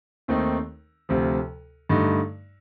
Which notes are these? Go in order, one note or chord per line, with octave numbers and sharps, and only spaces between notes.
D#2 D#3 A3 C4 D#4
D2 C3 F3
G2 D3 A3 D#4